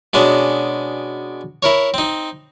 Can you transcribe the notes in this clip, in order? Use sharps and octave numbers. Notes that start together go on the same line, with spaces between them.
B2 G#3 C#4 D4
E4 A#4 C#5
C4 D#4